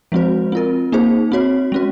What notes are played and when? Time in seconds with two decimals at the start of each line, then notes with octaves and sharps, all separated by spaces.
0.12 F3 G#3 C4 F#4 C5
0.52 C4 F4 A#4
0.92 A#3 D#4 G#4 C5
1.32 C4 F#4 C#5
1.72 G#3 C#4 F#4